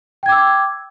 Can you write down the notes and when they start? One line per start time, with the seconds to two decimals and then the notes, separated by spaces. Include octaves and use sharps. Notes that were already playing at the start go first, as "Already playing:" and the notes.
0.23 G5
0.26 G#6
0.29 D6
0.32 E6